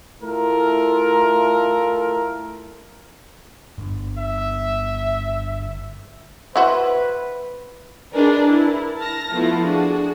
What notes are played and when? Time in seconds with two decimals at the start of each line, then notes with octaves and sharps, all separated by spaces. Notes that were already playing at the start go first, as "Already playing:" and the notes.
0.22 A3 E4 F4 A4 A#4
3.78 G1
4.18 E5
6.56 E4 F#4 B4 C5
8.13 D4 D#4 G#4 A#4 B4 D5
8.46 E4 A#4
8.99 A5 F6 A#6
9.32 F3 A3 B3 E4 F4
9.66 D4 F#4 G#4